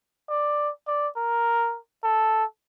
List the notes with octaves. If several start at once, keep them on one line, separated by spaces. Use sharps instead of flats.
D5
D5
A#4
A4